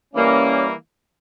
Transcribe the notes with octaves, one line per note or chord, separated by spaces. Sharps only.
E3 G3 A#3 C#4